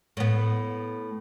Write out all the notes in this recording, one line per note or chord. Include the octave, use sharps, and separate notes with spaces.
A2 B3